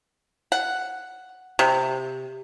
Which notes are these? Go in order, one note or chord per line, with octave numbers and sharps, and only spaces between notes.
F#5
C3